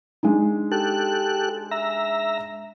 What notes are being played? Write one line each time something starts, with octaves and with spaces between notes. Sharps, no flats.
G#3 D4 D#4
G4 A4 F#6
E5 A#5